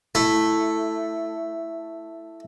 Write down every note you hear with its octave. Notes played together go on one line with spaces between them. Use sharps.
A3 E4